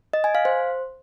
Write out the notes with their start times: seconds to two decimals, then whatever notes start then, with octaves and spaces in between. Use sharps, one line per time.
0.13 D#5
0.24 G#5
0.35 F5
0.45 C5